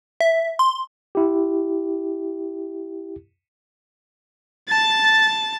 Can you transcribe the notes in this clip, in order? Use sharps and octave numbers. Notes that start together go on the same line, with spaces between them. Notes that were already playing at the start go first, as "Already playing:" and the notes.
E5
C6
E4 G4
A5 A6